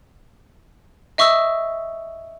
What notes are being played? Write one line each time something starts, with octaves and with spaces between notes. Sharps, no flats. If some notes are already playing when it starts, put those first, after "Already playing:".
D#5 E5 C#6 D#6 E6